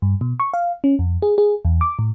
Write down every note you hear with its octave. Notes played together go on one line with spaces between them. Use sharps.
G2
B2
C#6
F5
C#4
F2
G#4
G#4
E2
D6
A2